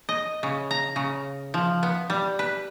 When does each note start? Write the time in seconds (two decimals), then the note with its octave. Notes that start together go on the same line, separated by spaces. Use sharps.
0.09 D#5
0.43 C#3
0.71 A#5
0.96 C#3
1.54 F3
1.83 B3
2.10 G3
2.39 B4